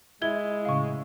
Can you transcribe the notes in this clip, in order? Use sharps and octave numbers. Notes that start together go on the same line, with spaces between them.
G#3 E4 G#6 G7
A2 C#3 F5 C#6